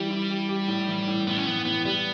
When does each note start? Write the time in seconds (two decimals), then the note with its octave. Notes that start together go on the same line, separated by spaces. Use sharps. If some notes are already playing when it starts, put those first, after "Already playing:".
Already playing: E3 G3 E4 G4
0.10 E4
0.30 G4
0.49 G4
0.68 A2
0.88 E3
1.08 A2
1.27 A2 B3
1.36 C#4
1.46 E3 B3
1.65 A2 B3
1.85 G3 B3